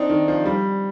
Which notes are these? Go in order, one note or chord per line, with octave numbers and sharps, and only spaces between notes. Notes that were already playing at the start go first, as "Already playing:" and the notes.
Already playing: C4 D4 D#4
D#3
F3
G3